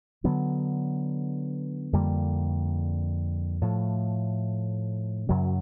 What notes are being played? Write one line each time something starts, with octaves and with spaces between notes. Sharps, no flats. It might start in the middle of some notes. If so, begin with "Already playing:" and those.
D3 F#3 B3 D4
F2 D3 G3 A#3
A2 F3 A3
F#2 C#3 F#3